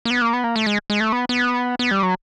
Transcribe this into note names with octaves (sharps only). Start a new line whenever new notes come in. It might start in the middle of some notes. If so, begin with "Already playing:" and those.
A#3
B3
A#3
B3
A#3
A3
G#3
G#3
A3
B3
B3
B3
G3
F#3